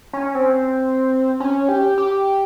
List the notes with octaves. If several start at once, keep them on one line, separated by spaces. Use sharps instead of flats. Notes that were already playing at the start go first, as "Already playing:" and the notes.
C#4
C4
C#4
G4
G4